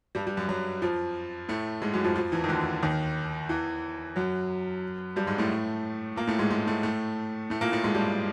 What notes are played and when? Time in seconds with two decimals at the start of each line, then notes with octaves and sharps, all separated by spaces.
0.15 G2 G3
0.27 G2 G3
0.37 F#2 F#3
0.49 F#2 F#3
0.82 F2 F3
1.49 A2 A3
1.82 G#2 G#3
1.93 F#2 F#3
2.04 F2 F3
2.16 F2 F3
2.32 E2 E3
2.44 D#3
2.49 D2 D3
2.82 D#2 D#3
3.49 E2 E3
4.16 F#2 F#3
5.16 G2 G3
5.27 G#2 G#3
5.38 A2 A3
6.16 A#2 A#3
6.27 A2 A3
6.39 G#2 G#3
6.50 G#2 G#3
6.67 A2 A3
6.83 A2 A3
7.50 A2 A3
7.61 A#2 A#3
7.72 A2 A3
7.84 G#2 G#3
7.95 G2 G3